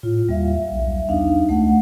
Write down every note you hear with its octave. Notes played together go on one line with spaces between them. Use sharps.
A2 F4
D#2 G3 E5 F5
B1
E2 D4 D#4 F5
C#2 A3 F#5